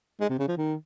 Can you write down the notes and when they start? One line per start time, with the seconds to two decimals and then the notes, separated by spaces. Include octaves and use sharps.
0.20 G#3
0.29 C3
0.39 C#3
0.48 F3
0.58 D#3